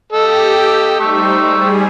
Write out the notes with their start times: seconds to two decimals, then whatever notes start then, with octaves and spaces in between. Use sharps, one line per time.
0.12 G4 A4 D#5
1.00 G3 A3 D#4 C5 C#6
1.47 G3 G#4